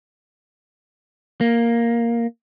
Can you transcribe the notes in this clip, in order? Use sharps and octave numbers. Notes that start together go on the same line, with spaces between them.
A#3